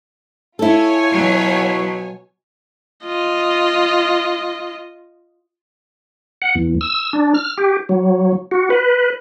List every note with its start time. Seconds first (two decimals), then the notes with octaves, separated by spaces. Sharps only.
0.59 E4 F4 A4 C#5 G#5
1.12 B2 F#3
3.05 F4 D#5
6.42 F#5
6.55 E2
6.81 E6
7.13 D4
7.34 F6
7.58 G4
7.89 F#3
8.51 F#4
8.70 B4